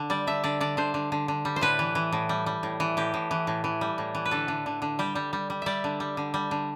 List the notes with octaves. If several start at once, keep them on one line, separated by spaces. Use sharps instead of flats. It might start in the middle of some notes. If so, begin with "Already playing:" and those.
Already playing: D3
G3 D5
D3 E5
D3 D5
D3 D5
D3 C5
D3
D3
D3
G3
C5
A2 B4
E3
E3
A2
G3
G3
A2
E3
A2 G4
A2
E3
A2
E3
G3
A2
E3
B4
D3 A4
D3
D3
D3
G3 G4
G3
G3
G3
G3 D5 E5
D3
G3
D3
G3
D3